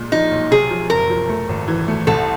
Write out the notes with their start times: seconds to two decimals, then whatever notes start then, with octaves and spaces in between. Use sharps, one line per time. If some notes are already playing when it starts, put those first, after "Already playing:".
Already playing: A#2 G#3
0.12 F3 D#4
0.31 B1
0.51 C3 G#4
0.71 F3
0.90 F#1 A#4
1.10 F3
1.29 A3
1.49 G#1
1.68 E3
1.88 A3
2.07 C2 A4